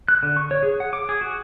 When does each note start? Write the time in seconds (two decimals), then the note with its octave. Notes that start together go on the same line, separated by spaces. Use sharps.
0.08 F#6
0.23 D3
0.37 C#6
0.51 C#5
0.63 G#4
0.80 F#5
0.93 D6
1.09 G#4
1.21 F#4